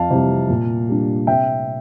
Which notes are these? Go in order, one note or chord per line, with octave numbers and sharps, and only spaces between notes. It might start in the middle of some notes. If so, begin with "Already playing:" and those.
Already playing: F2 F5 A5
C3 E3 G3
A#2
G3 D4
C3 E5 G5